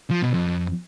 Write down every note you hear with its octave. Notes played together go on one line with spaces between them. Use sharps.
F3
B2
F2